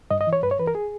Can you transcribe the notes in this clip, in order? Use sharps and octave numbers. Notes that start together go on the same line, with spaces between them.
G2 D#5
D#5
E3
C#5
G2 B4
C#5
E3 B4
A#4
G#4